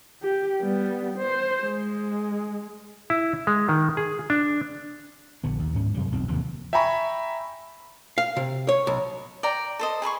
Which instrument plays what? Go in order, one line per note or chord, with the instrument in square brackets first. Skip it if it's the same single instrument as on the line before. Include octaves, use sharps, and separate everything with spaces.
[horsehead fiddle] G4
G3 B3
C5
G#3
[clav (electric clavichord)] E4
G#3
D#3
G#4
D4
[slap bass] A#1 D3 B3
D#2
D2 G#2 C#4
F#2 C3 F#3 G3
E1 B1 C4
D#2 C3 F3 A#3
[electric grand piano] E5 G5 G#5 A#5 B5 C#6
[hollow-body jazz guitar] F5
C3
C#5
B1
[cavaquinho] D5 G5 A#5
A4 C5 D#5
G#4 C5 B5 C#6